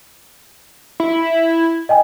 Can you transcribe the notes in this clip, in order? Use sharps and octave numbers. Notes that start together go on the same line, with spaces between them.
E4
D#5 G5 G#5